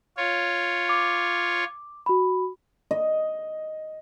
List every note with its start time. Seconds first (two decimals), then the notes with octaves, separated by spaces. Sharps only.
0.17 F4 C#5
0.89 D6
2.06 F#4 B5
2.91 D#5